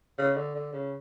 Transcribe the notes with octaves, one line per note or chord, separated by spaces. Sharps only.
C#3
D3
D3
C#3